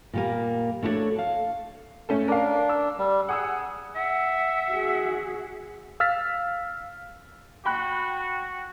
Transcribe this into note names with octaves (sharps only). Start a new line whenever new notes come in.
A#2 G3 A#3
A3 D4 E4 F#4 A4 C#5
F5 A5
A3 C#4 A4
D4 A#4 F5
E6
G3
G#4 F#5 D#6 E6
E5 F#5
F#4 G#4
F5 E6 F6 A6 B6
F#4 G5 B5 F#6